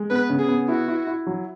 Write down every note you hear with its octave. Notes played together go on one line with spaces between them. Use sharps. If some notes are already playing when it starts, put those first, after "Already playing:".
Already playing: G#3
B3 B4
C#3
G#4
B3
E4 F#4
E4
E4
F#3